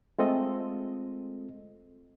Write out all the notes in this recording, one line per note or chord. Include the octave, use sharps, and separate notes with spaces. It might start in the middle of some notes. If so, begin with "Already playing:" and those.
G#3 A3 C4 F4 A4 D#5